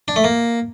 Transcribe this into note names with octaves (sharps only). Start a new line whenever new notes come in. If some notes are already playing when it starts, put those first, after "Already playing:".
D4
A3
A#3